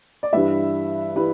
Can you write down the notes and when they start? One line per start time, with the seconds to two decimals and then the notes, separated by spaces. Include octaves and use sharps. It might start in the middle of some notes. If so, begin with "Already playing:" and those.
0.23 D5
0.33 G2 E3 G3 B4 E5
1.16 E3 G3 B4